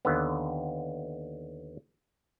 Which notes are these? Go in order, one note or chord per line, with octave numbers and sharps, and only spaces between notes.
D#2 D3 B3